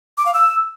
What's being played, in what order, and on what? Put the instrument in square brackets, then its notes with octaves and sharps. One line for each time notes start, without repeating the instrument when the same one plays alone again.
[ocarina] D6
F5
E6